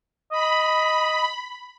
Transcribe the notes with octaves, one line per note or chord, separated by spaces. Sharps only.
D#5 B5